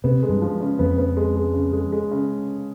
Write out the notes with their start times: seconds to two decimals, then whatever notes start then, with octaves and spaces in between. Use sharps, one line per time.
0.04 C3 B3
0.23 G#3
0.29 G2
0.42 F3
0.61 C#3
0.79 F2 B3
0.98 B3
1.17 G#3
1.36 G#3
1.54 C#3
1.73 G#3
1.92 G#3
2.11 C#3